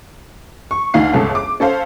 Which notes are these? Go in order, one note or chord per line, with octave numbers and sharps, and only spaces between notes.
C#6
D2 D#4 F5 C7
G1 C#2 A4
D6
C#4 A4 C5 F5